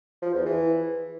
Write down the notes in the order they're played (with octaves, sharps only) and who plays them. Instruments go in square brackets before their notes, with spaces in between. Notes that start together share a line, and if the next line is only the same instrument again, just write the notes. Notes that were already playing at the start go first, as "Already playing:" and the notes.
[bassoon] F3
E2
E3